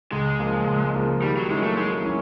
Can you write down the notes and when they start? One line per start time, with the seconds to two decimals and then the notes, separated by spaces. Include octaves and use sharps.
0.12 C#2 G#3
0.39 C#3 F3 A#3
0.67 C#2
0.94 C#3 F3 A#3
1.22 D#3 G3
1.36 F#3
1.49 F#3 G#3 A#3 C#4 E4
1.63 A3
1.77 D#3 G#3
2.05 F#3 A#3 C#4 E4